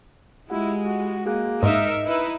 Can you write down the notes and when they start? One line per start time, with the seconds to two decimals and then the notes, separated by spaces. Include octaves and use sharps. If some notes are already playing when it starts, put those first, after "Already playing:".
0.50 G#3 E4 F4 G4 F#5
0.85 F#4
1.26 A#3 F#4 G#4 F#6
1.63 G#2 D#4 A#4 D#5 E5
2.05 D#4 E4 B4